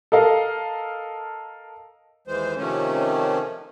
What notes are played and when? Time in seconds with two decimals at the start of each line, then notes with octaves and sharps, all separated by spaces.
0.12 A4 A#4 D#5 F5
2.28 D#2 E3 G#3 C5
2.57 C3 D#3 F3 A3 C#4